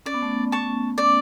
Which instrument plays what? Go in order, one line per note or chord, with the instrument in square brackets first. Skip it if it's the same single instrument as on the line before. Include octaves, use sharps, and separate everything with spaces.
[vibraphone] C#4 [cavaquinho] D5
[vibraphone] B3
A3
B3
[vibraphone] B3 [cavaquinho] A5 C#6
[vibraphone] C#4 [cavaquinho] D5